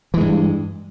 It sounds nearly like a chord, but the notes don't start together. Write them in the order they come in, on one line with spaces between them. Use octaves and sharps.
E3 G#3 G2